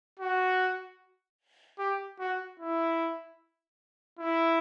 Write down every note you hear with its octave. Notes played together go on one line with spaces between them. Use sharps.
F#4
G4
F#4
E4
E4